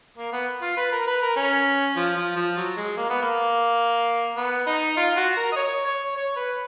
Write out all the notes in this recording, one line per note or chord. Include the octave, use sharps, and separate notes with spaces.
A#3
B3
F4
B4
A#4
B4
A#4
C#4
F3
F3
F3
F#3
G#3
A#3
B3
A#3
B3
D#4
F4
F#4
A#4
D#5
C#5
C#5
C#5
B4